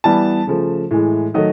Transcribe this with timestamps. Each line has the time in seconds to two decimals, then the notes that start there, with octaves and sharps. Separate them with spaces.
0.04 E3 G3 B3 A5
0.47 C#3 F3 A3
0.91 A2 E3 G#3
1.34 D#3 F#3 A3 D#5